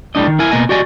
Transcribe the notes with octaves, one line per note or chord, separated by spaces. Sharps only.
A2 G3 D4 D#5
D#3
E4 A#4 G#5
B2 A#3 D#5 G#5
F#4 G4 D5 D#5 G#5